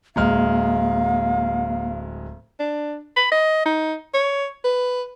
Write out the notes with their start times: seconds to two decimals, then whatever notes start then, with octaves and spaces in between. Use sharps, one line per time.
0.16 D1 G#3 A#3 F5 F6
2.60 D4
3.17 B5
3.32 D#5
3.66 D#4
4.14 C#5
4.64 B4